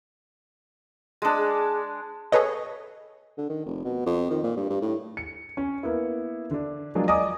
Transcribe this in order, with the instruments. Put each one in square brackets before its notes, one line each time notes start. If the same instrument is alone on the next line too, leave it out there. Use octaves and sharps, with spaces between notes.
[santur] G#3 D4
[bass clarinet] G#4
[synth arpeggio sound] G#4 A4 B4 C#5 D#5
[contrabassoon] D3
D#3
F1
B2
F2
D#3
A#2
G2
G2
A2
[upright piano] C#7
C#4
A#3 B3 E4
D3 D4
F3 F#3 G#3 A#3 D4 F4
D5 D#5 G#5 A#5 D6 D#6